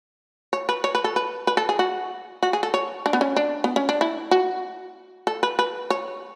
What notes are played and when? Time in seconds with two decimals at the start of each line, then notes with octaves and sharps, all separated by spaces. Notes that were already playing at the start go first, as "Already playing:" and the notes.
0.53 C#5
0.69 B4
0.84 C#5
0.95 B4
1.04 A4
1.16 B4
1.47 B4
1.57 A4
1.69 G#4
1.79 F#4
2.43 F#4
2.53 G#4
2.63 A4
2.74 C#5
3.06 D4
3.13 B3
3.21 C#4
3.36 D4
3.64 B3
3.76 C#4
3.89 D4
4.01 E4
4.31 F#4
5.27 A4
5.43 B4
5.59 B4
5.90 C#5